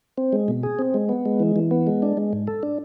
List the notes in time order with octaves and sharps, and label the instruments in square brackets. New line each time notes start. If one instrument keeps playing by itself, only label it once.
[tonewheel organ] C4
G#3
B2
G#4
C4
G#3
B3
G#3
E3
E3
B3
G#3
D4
G#3
G#2
A4
D4